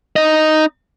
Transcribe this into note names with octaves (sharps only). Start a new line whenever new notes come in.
D#4 D#5